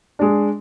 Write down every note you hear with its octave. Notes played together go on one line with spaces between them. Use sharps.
G#3 D4